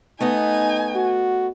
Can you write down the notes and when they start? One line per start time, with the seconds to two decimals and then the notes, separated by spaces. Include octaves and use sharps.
0.20 A3 B3 D#4 D#5 G#5
0.95 F#4